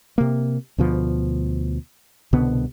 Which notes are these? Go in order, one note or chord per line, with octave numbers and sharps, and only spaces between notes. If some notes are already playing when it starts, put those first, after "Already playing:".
C3 A#3
D2 B2 F3
C2 B2 D3 B3